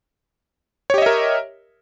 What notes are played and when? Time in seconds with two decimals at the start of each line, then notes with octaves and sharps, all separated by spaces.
0.90 C#5
0.94 G4
0.98 D#5
1.02 E5
1.06 A#4